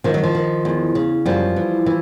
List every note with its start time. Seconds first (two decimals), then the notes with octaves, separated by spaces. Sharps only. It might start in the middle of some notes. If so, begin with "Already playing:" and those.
0.04 D#3 F3
0.14 F#3
0.24 F3
0.35 D#3
0.65 E2
0.95 C#3
1.26 F#2 F3 G3
1.56 E3
1.86 E3